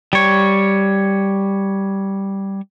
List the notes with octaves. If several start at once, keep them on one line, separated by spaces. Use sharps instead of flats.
G3 C#5